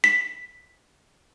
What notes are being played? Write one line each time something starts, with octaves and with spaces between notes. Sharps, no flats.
B6